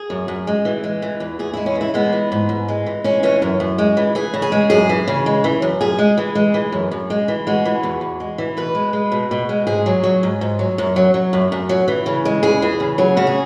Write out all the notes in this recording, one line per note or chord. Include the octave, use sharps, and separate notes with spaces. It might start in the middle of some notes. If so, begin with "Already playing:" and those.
Already playing: G#4
F#2
F#2
G#3
E3
G#3
E3
E2
E2 G#4
G#3 E4
C#4
E3
E4
G#3 B3
E3
G#2
G#2
G#3
E3
G#3 C#4
E3 C#4
F#2
F#2
G#3
E3
E3 G#4
C#3
G#4
G#3
F#2 G#4
E3
C#3
G#3
E3
F#2
F#2 G#4
G#3
E3
G#3
E3
F#2
F#2
G#3
E3
G#3 F#4
E3
E2
E2
G#3
E3
B2 B4
G#3
G#3
B2
B2
G#3
G#2 G#4
F#3
F#3
G#2
G#2
F#3
F#2
F#3
F#3
F#2
F#2
F#3
E3
C#3
G#3
E2 G#4
E3
C#3
F#3 G#4
C#3 F#4
G#4